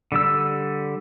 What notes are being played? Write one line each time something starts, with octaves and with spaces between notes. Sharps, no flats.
D3 G3 E6